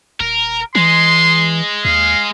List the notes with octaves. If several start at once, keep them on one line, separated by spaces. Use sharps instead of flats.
D#1 A#4
E3 G#3 C6
D#2 F5